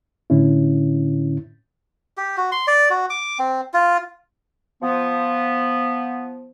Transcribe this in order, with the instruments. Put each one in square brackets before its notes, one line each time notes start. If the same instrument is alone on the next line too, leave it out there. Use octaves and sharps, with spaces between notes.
[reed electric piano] A2 D3 C#4 E4
[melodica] G4
F#4
C6
D5
F#4
D6
C4
F4
[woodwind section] F3 B3